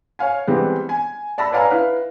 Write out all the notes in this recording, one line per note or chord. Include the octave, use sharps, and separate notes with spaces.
C#5 F5 G#5
E3 G3 G#3 B3 C4
G#5
D5 A5 B5 E6 A#6
B4 C#5 D5 F5 G#5 A#5
E4 B4 F5